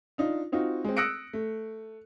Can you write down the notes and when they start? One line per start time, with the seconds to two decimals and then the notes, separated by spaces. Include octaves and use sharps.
0.18 D4 D#4 F4
0.52 C4 D#4 F4 F#4
0.84 G#3 C4
0.97 D#6 E6 F#6 A#6 C#7 D7
1.33 A3